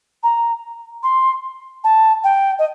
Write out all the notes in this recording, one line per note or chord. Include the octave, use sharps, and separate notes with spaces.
A#5
C6
A5
G5
D#5